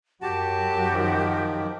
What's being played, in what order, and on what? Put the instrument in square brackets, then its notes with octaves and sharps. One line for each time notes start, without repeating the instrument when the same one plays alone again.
[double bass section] F#2 [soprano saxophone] F#4 [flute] G4 [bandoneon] A5
[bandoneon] D#3 F3